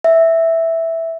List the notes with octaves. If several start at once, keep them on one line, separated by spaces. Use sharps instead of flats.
E5